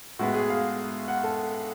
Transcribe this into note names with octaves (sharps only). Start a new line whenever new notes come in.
A2 G#3 B3 F#4
G#4
F5
F#5
A4